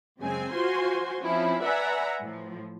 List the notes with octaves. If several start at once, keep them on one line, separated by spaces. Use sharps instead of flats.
F#2 C#3 G#3 C4 G#5
F4 F#4 C5 G#5 C6
F3 C4 C#4 E4
B4 D5 E5 F#5 G#5 A#5
A2 F3